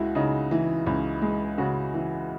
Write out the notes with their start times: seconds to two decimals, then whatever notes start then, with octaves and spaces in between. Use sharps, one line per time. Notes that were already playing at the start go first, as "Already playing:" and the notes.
Already playing: C#2 G#3 E4 F#4
0.15 C#3 D#4
0.51 E3
0.86 C#2
1.22 G#3
1.58 C#3 F#4
1.94 E3